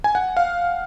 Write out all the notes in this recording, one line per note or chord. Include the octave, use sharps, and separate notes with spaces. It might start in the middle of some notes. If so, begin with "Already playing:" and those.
G#5
F#5
F5